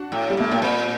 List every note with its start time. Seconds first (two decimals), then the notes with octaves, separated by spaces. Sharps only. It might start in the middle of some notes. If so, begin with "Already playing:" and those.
Already playing: D4 F#4
0.12 A2
0.30 G3
0.37 A#2 A3
0.52 A2 A#3
0.62 A#2 C4